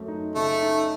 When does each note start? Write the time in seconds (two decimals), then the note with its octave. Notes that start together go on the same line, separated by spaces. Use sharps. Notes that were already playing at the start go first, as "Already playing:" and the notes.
Already playing: F#2 A3
0.08 D#4
0.35 C#3 A3
0.62 D#4